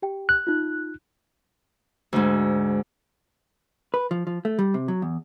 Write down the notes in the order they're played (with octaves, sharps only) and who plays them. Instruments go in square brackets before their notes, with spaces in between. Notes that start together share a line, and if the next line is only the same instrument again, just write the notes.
[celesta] G4 G5
[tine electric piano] F#6
[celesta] D#4 F4
[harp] D2 G#2
[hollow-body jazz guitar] B4
F3
F3
A3
G3
C3
F#3
E2